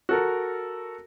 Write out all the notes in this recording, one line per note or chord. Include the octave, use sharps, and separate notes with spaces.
F#4 A4 A#4